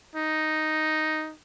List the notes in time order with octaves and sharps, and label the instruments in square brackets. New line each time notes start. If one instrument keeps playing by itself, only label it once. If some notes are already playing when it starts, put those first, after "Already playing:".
[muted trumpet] D#4